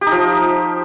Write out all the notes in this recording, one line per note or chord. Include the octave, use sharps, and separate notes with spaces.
G4
D#4
F3